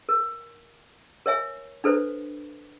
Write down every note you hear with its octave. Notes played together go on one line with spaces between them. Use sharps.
A#4
A#4 C#5 E5 G#5
D4 A4 B4 C5